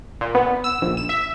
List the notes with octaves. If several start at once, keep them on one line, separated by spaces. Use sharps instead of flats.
A#2
B3
E6
A#1
E7
E5